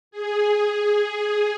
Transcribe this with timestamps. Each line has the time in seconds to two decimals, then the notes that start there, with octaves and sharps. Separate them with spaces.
0.11 G#4